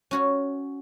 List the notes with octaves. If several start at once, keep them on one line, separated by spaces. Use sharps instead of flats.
C#4 F#4 C#5